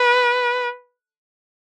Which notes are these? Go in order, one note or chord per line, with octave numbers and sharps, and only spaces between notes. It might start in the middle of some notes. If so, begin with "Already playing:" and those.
Already playing: B4